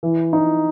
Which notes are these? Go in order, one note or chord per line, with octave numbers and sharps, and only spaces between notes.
E3
D#4